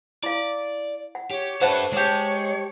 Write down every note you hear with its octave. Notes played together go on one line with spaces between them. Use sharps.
E4 D5 F5
F#5
G4 C#5
A3 G4 B4 C5 F#5 A5
G#3 G4 C#5 A5